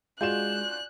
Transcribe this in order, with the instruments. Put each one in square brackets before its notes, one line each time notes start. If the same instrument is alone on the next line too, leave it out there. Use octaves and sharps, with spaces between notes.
[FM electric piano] G#3 [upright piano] F4 F#4 E7 [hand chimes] D5 G#5 G6 [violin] F#6